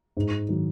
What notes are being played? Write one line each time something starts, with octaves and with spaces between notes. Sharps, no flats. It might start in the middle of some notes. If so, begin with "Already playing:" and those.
G#2
D#3 F#3